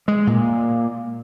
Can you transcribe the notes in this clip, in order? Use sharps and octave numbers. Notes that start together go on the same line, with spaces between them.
G#3
A#2